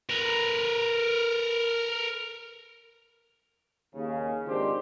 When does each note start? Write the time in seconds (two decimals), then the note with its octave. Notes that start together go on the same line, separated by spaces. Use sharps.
0.10 A#4 B4
3.94 D#2 C#3
4.46 G#1 C#2 D4 D#4 G4 C5